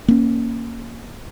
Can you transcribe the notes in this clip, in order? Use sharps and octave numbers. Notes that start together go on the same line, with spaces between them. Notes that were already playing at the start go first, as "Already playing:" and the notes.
A#3 C#4